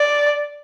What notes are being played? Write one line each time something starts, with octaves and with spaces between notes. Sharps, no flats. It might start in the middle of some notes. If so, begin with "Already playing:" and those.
Already playing: D5